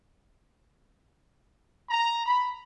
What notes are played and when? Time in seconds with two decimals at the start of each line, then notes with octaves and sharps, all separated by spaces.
1.90 A#5
2.26 B5